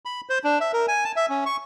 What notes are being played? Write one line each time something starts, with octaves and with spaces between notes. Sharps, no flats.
B5
C5
D4
E5
A#4
G#5
A5
E5
C#4
C#6